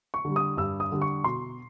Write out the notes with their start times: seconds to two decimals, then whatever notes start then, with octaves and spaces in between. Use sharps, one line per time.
0.14 C#6
0.25 D3 G3
0.36 D#6
0.57 G2 E6
0.80 D#6
0.91 D3 G3
1.02 C#6
1.24 B2 C6